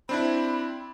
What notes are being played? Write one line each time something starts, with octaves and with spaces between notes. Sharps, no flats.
C4 D4 E4 B5